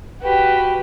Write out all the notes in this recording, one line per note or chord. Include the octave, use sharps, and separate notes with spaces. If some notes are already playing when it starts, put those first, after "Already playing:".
F#4 G4 B4